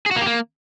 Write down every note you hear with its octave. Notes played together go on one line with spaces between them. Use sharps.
G#4
F#4
A#3
G4
A#3